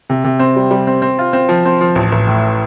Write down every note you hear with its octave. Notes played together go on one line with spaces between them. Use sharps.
C3
C3
C4
G3
G3
C4
C4
F4
C4
F3
C4
F3
A1
A1
A2